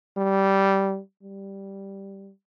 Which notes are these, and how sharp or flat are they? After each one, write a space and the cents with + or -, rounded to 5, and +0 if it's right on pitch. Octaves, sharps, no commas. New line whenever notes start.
G3 -10
G3 +0